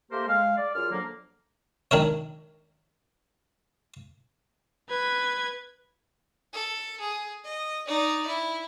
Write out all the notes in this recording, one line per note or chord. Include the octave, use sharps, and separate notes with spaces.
A3 A#3 G4 A#4 C5
G#3 F5
D5
F#2 F4 G#4 F6
D3 F3 F#3 A#3
D#3 D4 A#4 C#5
B4 G#6
A4
G#4
D#5
D#4 D5
E4